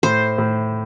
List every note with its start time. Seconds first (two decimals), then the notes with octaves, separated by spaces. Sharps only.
0.03 A2 C5
0.38 A2